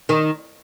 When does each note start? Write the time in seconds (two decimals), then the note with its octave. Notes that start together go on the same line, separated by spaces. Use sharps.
0.09 D#3